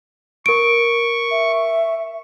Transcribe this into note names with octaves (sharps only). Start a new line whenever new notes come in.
A#4 C#6 D7
E5